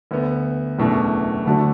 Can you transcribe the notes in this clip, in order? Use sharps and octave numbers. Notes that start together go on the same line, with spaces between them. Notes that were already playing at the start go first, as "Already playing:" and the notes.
D2 D3 B3
F#1 E2 B2 A3 D4
D2 D3 A3 D4 F#4